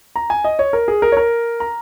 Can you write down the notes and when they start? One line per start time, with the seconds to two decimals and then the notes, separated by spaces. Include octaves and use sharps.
0.16 A#5
0.30 G#5
0.44 D#5
0.59 C#5
0.73 A#4
0.88 G#4
1.02 A#4
1.12 C#5
1.17 A#4
1.60 A#5